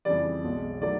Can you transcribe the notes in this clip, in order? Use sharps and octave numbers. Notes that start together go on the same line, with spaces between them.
F2 C#3 E3 G3 D5
B1 B2 G#3
D#3 F#3 A3 D5